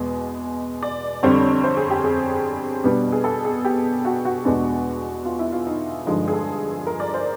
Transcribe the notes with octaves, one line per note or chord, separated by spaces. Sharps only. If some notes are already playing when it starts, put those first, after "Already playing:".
Already playing: E2 B2 G#3 B3
D5
F2 D3 G3 C4 C#5
C5
G#4
G4
G#4
B2 G3 B3 D4
G#4
A4
G#4
G4
F#4
F#4
E2 B2 G#3 B3 D4
F4
E4
F4
D#4
G2 D3 F3 G#3 D#4
G#4
A4
A#4
D5
C5